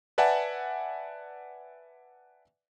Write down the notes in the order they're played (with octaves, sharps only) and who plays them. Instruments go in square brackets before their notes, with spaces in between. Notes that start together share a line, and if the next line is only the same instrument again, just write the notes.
[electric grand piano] B4 D5 E5 F#5 G#5 A5